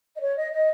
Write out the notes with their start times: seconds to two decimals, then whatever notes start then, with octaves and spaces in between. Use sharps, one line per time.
0.15 D#5
0.20 C#5
0.37 D#5
0.52 D#5